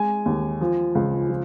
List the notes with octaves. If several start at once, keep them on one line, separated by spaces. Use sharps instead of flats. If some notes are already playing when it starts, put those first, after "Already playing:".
Already playing: G#3 G#5
D#2
F3
C#2
F3